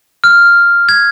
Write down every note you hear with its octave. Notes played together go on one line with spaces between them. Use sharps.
F6
G#6